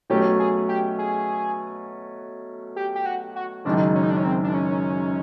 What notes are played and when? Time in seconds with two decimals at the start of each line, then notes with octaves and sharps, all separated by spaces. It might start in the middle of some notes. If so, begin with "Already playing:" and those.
0.10 B2 F#3 A3 C#4 G4
0.39 G#4
0.69 G4
0.99 G#4
2.76 G4
2.95 G4
3.06 F#4
3.36 F#4
3.65 F#1 F#2 D#3 G#3 D4
3.95 C#4
4.03 D#4
4.10 D4
4.17 C#4
4.24 C4
4.44 D4
4.54 C#4